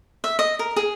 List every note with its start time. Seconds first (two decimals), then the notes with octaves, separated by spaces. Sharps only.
0.24 E5
0.39 D#5
0.59 A#4
0.76 G#4